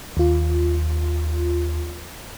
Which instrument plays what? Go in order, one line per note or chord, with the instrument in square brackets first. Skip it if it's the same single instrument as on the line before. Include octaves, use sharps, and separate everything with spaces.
[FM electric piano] D#2 F4